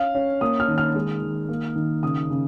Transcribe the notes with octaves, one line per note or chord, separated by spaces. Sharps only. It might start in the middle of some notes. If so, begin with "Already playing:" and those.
Already playing: C#4 F5
C#4
A#3 D#6
F6
D#3
F6
G#3
D#3
A#3
D#3
C#3 D#6
C#3